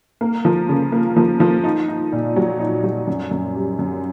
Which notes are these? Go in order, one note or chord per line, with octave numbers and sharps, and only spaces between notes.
A#3
F3
C#3
A#3
F3
F3
D#4
D#4
A#2
F#3
D#4
F#3
F#2
F#2
G3
F#2